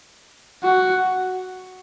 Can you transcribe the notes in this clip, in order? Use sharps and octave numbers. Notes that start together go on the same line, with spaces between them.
F#4